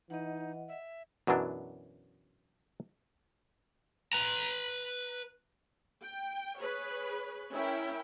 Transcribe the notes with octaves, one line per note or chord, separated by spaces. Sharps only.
E3 D#4 D#5 F#5
E5
F#2 B2 E3 F#3 D4
B4 A#5
G5
G#4 B4 C#5
C#4 E4 A#4 E5 G5